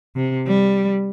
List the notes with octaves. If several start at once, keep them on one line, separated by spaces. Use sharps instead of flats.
C3
G3